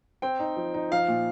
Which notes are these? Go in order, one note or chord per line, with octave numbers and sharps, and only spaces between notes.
C4 G5
D#4
F3
D#4
F3 F5
A#2